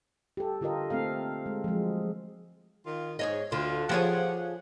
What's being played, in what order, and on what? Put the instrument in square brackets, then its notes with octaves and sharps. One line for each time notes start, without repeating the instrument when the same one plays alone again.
[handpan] G4 A4
D3 F4 G4 A#4 D#5
A3 A#3 C4 A4 F5
G#3
F3 F#3 G#3
[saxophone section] D#3 F4
[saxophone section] G#2 [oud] G#4 C#5 D#5
[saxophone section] D2 F4 [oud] D3
[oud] F3 G#4 C#5 [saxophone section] G4 F#5